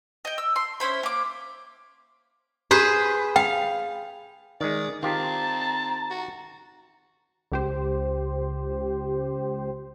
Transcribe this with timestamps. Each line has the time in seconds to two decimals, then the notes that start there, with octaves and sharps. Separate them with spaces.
0.25 D#5 G5
0.38 E6
0.56 C6
0.80 C#4 E4 C5 B5
1.03 A#3 D6
2.71 G4 G#4 B4 C5
3.36 F5 G5
4.61 D#3 G#3 D5 D#6
5.03 D#3 C4 F4 G4 A5 A#5
6.11 F#4
7.52 C#2 G4 C5